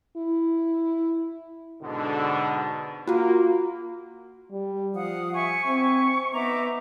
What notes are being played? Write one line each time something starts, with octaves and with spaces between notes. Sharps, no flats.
E4
G#2 B2 D3
A#3 F4 F#4
G3
F3 F5 F#5 D#6
E5 G#5 C#6
C4 C#6
B3 D#4 E5 A#5 D6